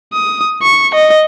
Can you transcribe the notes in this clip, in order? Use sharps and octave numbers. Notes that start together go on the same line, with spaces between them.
D#6
C#6
D#5